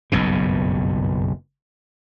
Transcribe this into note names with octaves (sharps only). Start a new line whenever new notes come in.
F#1 B1 G2 B2